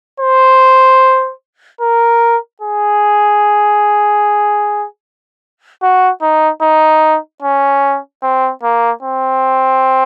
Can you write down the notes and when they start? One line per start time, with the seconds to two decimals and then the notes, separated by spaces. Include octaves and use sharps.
0.20 C5
1.81 A#4
2.62 G#4
5.82 F#4
6.22 D#4
6.62 D#4
7.42 C#4
8.23 C4
8.63 A#3
9.03 C4